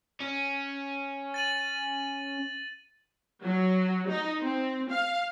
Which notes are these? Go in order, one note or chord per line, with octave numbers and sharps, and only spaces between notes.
C#4
A6 D#7 F#7
F#3
D#4
C4
F5